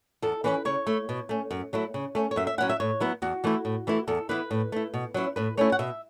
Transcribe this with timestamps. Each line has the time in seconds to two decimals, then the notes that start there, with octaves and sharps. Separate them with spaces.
0.22 E2 A4
0.44 E3 C#4 E4 B4
0.65 C#3 C#5
0.87 A3 E4
1.09 B2
1.29 A3 C#4
1.51 F#2
1.73 F#3 A3 E4
1.94 C#3
2.15 A3 C#4
2.31 C#5
2.36 F#2 E5
2.47 E5
2.58 F#3 C#4 E4 F#5
2.69 E5
2.80 A2 C#5
3.00 F#3 B3 E4
3.22 E2 F#4
3.44 E3 A3 E4
3.65 A2
3.87 E3 A3 E4
4.07 E2 A4
4.29 E3 B3 E4 B4
4.51 A2
4.72 A3 E4
4.94 B2
5.14 F#3 C#4 E4
5.36 A2 B4
5.57 A3 C#4 E4 C#5
5.72 F#5
5.79 B2 E5